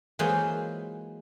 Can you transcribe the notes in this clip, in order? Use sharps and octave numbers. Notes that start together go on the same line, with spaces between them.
E3 F#3 G#3 A#3 F4 C5